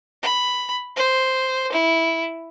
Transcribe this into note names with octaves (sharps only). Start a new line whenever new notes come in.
B5
C5
E4